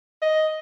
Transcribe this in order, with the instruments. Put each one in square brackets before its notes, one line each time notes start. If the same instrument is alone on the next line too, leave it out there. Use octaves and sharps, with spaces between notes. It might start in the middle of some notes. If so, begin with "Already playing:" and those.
[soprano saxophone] D#5